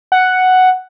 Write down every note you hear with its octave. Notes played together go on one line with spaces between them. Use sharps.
F#5